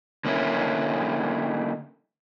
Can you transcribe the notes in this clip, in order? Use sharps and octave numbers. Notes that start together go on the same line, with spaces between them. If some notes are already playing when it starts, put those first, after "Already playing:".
D3 A#3 C#4 E4